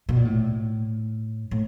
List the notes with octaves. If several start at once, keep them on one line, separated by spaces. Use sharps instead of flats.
B2
A#2
A2
A2